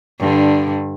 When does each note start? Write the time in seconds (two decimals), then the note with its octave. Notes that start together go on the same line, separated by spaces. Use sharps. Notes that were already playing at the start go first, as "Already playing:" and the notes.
0.20 G2 D3